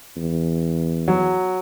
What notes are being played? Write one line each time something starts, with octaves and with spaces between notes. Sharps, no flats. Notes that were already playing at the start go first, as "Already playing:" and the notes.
E2
F#3